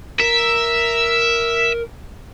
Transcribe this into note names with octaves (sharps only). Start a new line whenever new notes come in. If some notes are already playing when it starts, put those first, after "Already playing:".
A#4 E5